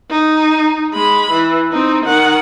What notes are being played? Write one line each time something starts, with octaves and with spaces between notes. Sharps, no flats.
D#4
G#3 B5
E3
C4 D#4
D#3 F#5